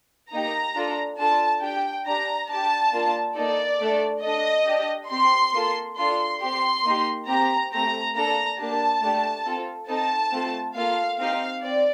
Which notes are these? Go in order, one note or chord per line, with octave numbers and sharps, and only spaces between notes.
A#3 D#4 G4 A#5
D4 F4 A4
D4 F4 A4 A5
D4 G4 G5
D4 G4 A#5
D4 G4 A5
A#3 D4 F4
A#3 D#4 A4 D5
A3 D4 A4
D4 A4 D#5
D4 G4
C4 G4 C6
A#3 F4 A4
D4 F4 A4 C6
C4 G4 C6
A#3 D#4 G4
C4 G4 A#5
A3 C4 G4 A#5
A#3 D4 A4 A#5
A#3 D4 G4 A5
A3 D4 G4
C4 F4 A4
C4 D#4 A4 A5
A3 C4 F4 A4
A#3 F4 A4 F5
C4 D#4 G4 F5
C4 D5